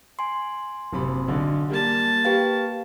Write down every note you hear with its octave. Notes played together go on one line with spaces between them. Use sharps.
G#5 C6
F#1 C3 B5
B1 D3
G3 A#3 A5
G4 B4 F5 G5